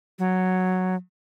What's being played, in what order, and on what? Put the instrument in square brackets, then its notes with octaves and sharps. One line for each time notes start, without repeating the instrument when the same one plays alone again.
[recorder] F#3